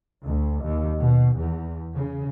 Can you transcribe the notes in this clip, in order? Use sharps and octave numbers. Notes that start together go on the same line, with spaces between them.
D2
D#2
B2
E2
C#3